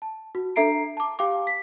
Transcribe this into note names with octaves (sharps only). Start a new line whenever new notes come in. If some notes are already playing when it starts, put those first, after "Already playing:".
A5
F#4
D4 A4 E5 A#5 C7 D7
A5 D6
G4 F5 G5 D6
B6